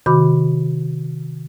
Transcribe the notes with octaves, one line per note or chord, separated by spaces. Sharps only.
C3 D#3 F#4 B5 D6